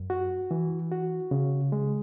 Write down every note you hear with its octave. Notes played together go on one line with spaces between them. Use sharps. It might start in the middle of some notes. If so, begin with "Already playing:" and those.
Already playing: F#2
F#4
E3
F#4
C#3
G#3